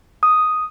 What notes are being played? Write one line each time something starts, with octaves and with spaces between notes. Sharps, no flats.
D#6